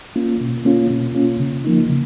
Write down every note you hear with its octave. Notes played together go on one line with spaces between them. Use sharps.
A#3 C#4 F4
B2
A#3 C#4 F4
B2
A#3 C#4 F4
C#3
F3 A#3 D#4
C#3